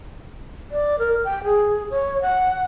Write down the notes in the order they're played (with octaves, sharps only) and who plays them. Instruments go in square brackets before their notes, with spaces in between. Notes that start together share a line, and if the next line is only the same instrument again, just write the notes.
[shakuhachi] D5
A#4
G5
G#4
C#5
F#5